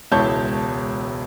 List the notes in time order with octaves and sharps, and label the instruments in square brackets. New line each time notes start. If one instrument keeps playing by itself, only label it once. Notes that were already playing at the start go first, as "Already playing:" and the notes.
[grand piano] E1 C#2 E4 C#5 A5 G6